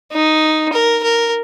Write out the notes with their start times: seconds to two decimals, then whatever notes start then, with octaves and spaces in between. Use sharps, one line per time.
0.12 D#4
0.73 A#4
1.03 A#4